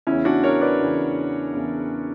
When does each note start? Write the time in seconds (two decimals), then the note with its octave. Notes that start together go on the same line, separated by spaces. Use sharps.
0.07 E2 C#3 E3 C#4 E4
0.25 D4 F#4
0.44 A#4 C#5
0.61 B4 D5
0.80 E2 C#3 E3
1.53 E2 C#3 E3